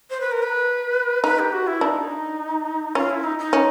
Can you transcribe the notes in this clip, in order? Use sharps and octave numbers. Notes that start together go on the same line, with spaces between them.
C5
B4
A#4
B4
D#4 B4
G4
F#4
E4
D4 D#4
C#4 F4
E4
D#4
D#4
C#4